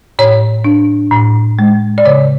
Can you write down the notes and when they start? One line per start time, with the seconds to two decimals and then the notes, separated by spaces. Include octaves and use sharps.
0.19 A2 C#5
0.64 D4
1.11 A2
1.59 G#3
1.98 D5
2.05 C#3 C#5